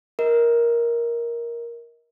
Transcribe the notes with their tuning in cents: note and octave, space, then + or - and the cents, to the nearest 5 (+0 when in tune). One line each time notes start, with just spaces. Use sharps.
A#4 +10 D#5 +35